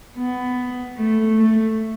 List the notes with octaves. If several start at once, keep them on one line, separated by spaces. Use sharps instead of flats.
B3
A3
A3